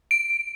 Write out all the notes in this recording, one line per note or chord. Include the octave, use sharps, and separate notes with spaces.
D7